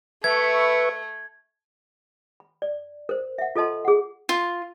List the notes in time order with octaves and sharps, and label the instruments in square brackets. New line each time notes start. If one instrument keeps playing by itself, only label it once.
[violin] A3 [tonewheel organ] B4 E5 C#6 [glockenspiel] G#6
[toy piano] B5
D5
A#4 C5
E5 F#5
F4 A4 A#4 D#5 A5 C6
G#4 F#5
[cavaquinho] F4